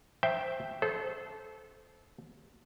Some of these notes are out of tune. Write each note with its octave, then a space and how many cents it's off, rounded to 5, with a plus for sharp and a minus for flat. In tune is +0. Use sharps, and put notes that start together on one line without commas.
C5 +0 E5 +0 G5 +0
A4 -25 C5 -15